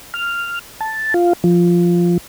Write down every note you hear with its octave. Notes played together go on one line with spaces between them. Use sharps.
F6
A5
F4
F3